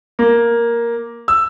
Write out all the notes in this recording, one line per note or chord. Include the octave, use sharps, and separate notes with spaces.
A#3
E6